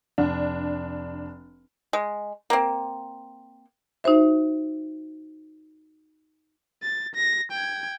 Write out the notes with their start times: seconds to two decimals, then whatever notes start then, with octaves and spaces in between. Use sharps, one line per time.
0.18 F1 D4
1.93 G#3
2.50 A#3 C4
4.04 D#4 F#4 C5 E5
6.83 A6
7.15 A#6
7.52 G5 G#6